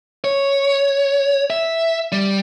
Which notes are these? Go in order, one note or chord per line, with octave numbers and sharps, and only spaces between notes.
C#5
E5
G3